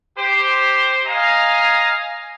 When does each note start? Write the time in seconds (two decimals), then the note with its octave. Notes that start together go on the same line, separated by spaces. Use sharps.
0.18 G4 C5
1.07 D#5 F5 G#5 A#5